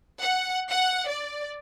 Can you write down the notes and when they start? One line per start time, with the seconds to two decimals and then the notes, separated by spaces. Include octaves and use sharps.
0.20 F#5
0.71 F#5
1.08 D5